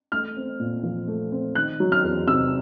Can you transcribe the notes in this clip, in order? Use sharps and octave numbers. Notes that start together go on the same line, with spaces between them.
A3 F6
C4
A#2
F3
A3
C4
D#3 F#6
F#3
F6
E2
C3 E6